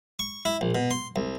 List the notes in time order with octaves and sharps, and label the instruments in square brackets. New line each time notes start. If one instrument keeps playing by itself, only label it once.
[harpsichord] C#6
E4
A#1
B2
C6
C2